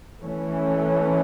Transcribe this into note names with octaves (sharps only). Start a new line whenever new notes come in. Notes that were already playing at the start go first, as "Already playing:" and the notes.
E3 A3 C#4